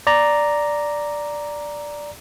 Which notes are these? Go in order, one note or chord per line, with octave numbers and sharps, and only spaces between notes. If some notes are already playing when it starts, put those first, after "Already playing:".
D5 A#5